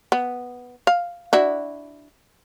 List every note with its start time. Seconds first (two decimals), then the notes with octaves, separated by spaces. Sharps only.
0.12 B3
0.87 F5
1.33 D4 E4 F#4